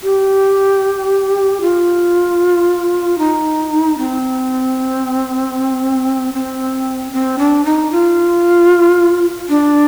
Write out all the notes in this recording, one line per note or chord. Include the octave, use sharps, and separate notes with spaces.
G4
F4
D#4
C4
C4
C4
D4
D#4
F4
D4